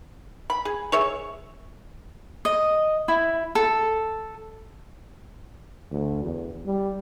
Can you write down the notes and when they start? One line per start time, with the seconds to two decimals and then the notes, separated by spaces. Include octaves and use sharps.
0.50 B5
0.65 G#4
0.92 G#4 C#5 E5
2.45 D#5
3.08 E4
3.55 A4
5.91 D2
6.25 E2
6.66 G3